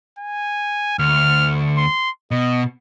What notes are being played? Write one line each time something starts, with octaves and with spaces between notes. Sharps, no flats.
G#5
D2 F6
C6
B2 D#5